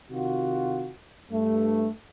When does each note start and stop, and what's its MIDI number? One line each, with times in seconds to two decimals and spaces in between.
0.11 0.90 48
0.11 0.90 51
0.11 0.90 65
0.11 0.90 66
1.32 1.88 43
1.32 1.88 57